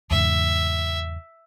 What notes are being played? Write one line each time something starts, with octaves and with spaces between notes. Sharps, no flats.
E2 G#2 C#3 E5